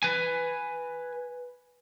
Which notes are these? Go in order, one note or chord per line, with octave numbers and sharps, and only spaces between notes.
B4 G#5